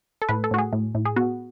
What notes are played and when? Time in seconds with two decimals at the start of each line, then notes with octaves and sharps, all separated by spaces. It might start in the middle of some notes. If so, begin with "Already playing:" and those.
0.22 A4
0.29 A2 B4
0.44 A4
0.51 A2 F#4
0.58 G#4
0.73 A2
0.95 A2
1.05 G#4
1.16 B3 F#4